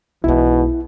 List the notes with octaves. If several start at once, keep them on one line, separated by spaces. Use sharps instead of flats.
B1 G#2 B2 E3 C#4 E4